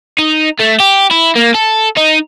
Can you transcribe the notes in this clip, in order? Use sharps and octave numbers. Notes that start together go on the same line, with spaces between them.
D#4
A3
G4
E4
A#3
A4
D#4